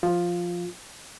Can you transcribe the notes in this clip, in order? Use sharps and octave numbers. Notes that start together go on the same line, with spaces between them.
F3 F4